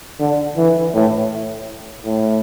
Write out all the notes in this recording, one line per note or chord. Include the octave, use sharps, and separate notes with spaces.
D3
E3
A2
A2